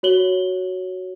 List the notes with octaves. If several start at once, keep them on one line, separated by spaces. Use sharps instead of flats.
F#4 C#5 F#7 G7